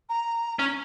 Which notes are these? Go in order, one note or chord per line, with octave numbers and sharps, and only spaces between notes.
A#5
C#4